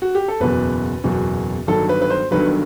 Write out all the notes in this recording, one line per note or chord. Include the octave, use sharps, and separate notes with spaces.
F#4
G4
A4
F#1 E2 B2 F#3 B4
F#1 E2 B2 F#3
G1 G2 D#3 F#3 A4
B4
B4
C5
G1 G2 D#3 F#3 B4